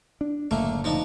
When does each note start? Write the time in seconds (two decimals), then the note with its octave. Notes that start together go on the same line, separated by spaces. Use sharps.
0.21 D4
0.51 F#1 A2 D3 A3 A#3
0.84 F3 D4 D#4